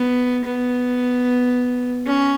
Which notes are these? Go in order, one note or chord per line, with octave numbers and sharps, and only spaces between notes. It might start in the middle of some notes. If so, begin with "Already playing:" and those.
Already playing: B3
B3
C#4